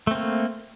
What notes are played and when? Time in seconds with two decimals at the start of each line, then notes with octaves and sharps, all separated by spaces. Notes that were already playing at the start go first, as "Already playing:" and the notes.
0.07 A3
0.11 C4
0.15 A#3